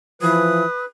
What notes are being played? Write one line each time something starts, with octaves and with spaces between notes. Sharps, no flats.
E3 F3 B4 D#6